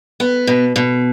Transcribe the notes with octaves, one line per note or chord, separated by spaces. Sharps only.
B3
B2
B2